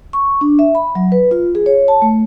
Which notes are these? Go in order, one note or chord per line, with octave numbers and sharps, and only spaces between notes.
C#6
D4
E5
B5
F#3
B4
F4
G#4
C#5
A5
A3